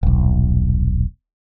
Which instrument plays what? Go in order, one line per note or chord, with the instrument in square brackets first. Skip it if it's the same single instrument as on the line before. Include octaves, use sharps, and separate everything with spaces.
[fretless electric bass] D#1 B1